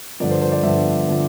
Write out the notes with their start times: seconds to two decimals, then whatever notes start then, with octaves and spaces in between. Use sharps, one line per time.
0.20 G2 D3 F3 D5
0.31 C5
0.41 C5
0.52 D5
0.63 G2 D3 F3 E5
1.08 D3 F3